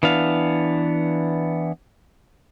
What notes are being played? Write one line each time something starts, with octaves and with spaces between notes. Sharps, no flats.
E3 B3 D4 F5